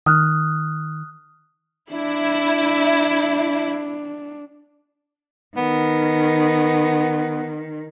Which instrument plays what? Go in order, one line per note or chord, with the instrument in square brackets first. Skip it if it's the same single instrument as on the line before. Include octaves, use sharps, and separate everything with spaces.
[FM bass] D#3 [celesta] D#6 F6 F#6
[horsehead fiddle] D4 [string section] E4
[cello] D#3 [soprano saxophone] B3